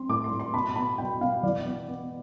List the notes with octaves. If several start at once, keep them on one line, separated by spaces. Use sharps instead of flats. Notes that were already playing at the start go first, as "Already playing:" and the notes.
Already playing: C4 C6
A2 D6
C6
A2
C6
B2 B5
B3 B5
B2 G5
B2 F5
E3 D5
B3
B3